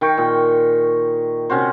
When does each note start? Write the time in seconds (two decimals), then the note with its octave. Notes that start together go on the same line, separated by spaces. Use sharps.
0.01 D#3 G5 C#6
0.18 A#2
1.50 C3 C#4 F#4 C5